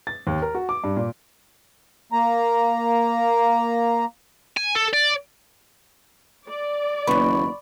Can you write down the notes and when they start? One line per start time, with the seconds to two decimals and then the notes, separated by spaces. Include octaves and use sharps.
0.07 A6
0.27 D#2
0.42 A#4
0.55 F#4
0.69 D6
0.84 G2
0.97 A#2
2.12 A#3 A#5
4.57 G#5
4.75 A4
4.93 D5
6.48 D5
7.07 F#1 D#2 B3 B5 C#6